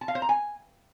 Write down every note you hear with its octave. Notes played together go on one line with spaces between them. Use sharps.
A5
F5
C5
A#5
G#5